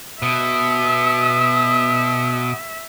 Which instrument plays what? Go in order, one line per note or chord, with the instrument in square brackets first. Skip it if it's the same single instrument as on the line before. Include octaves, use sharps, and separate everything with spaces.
[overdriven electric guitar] B2 [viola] E5 [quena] D#6